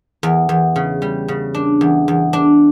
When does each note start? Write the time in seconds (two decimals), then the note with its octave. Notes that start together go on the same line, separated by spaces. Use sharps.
0.23 E2
0.49 E2
0.76 C#3
1.02 G3
1.28 C#3
1.55 D4
1.81 E2
2.08 E2
2.33 D4